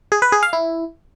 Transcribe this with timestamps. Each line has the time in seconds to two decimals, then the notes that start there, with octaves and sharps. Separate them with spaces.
0.12 G#4
0.22 B4
0.32 G#4
0.43 F5
0.53 E4